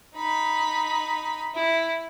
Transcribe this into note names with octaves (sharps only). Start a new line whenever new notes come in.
D#4 B5
E4